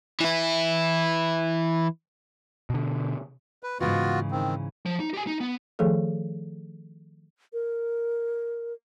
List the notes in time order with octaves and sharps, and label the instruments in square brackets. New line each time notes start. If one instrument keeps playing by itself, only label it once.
[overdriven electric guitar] E3 E4
[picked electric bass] B2 D3
[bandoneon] B4
[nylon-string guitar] G#2 C#3 E3 [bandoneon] B3 F4 F#4
[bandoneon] D#3 C4
[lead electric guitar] F3
D#4
G4 G#5
D#4
B3
[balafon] D#3 F3 A3 G#4 A4
[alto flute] A#4